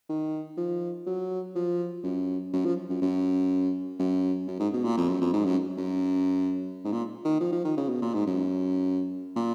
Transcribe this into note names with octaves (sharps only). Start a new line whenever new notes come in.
D#3
F3
F#3
F3
F#2
F#2
F3
F#2
F#2
F#2
F#2
G#2
B2
A#2
F2
F#2
F2
G#2
F#2
F#2
G#2
A#2
D#3
F3
F3
D#3
C#3
B2
A#2
G#2
F#2
A#2